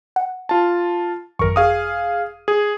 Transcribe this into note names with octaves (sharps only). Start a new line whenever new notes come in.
F#5
F4 A5
G#1 F#2 A#4 C#6
G#4 F5 D#6
G#4